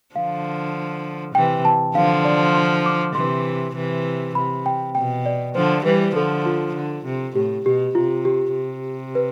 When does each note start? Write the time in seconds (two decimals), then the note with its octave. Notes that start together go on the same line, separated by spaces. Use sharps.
0.15 D3 F3 F5
1.35 C3 E3 G5
1.65 A5
1.95 D3 F3 F5
2.25 D5
2.55 C6
2.86 D6
3.15 C3 E3 C6
3.76 C3 E3
4.35 C3 B5
4.66 G5
4.95 B2 G5
5.26 D5
5.55 D3 F3 C5
5.85 E3 G3 B4
6.15 D3 F3 A4
6.46 F4
6.75 D3
7.05 C3
7.36 A2 G4
7.65 B2 G4
7.95 C3 F4
8.25 G4
8.55 C3
9.15 B4